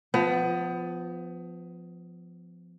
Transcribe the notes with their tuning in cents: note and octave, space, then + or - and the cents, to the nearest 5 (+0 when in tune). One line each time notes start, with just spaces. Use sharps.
F3 +0 B3 +25